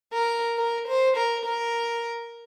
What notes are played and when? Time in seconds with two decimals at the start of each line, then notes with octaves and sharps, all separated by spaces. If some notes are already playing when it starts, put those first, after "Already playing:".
0.13 A#4
0.58 A#4
0.88 C5
1.17 A#4
1.45 A#4